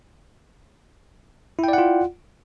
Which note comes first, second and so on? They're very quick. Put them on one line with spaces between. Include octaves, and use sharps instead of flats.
E4 G5 D5 F#5 F4